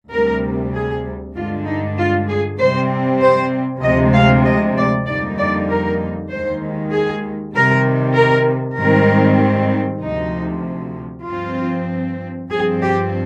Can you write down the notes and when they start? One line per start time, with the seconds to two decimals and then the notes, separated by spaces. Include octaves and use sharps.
0.11 D2 C3 G3 A#4
0.73 G#4
1.35 G2 D3 G#3 D4 F4
1.66 D#4
1.97 F4
2.28 G#4
2.58 C3 G3 C4 C5
3.21 C5
3.82 D2 C3 F3 G#3 D#5
4.13 F5
4.44 D#5
4.76 D5
5.06 F2 D3 G3 A#3 D#4 D5
5.38 D5
5.69 A#4
6.30 D#2 D#3 G#3 C5
6.92 G#4
7.54 C3 D#3 G3 A#4
8.16 A#4
8.78 G#2 D#3 G3 C4 A#4
10.02 D2 C3 F3 D#4
11.26 G2 F3 C4 F4
12.49 G2 F3 C4 G#4
12.81 G4